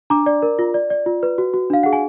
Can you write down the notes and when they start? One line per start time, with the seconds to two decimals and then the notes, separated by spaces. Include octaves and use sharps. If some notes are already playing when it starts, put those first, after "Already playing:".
0.10 D4 A#5 D6
0.26 D5
0.42 A#4
0.59 F4
0.74 D5
0.90 D5
1.06 F4
1.23 B4
1.38 F#4
1.54 F#4
1.70 D4 F5
1.83 G#4 F#5
1.93 G#5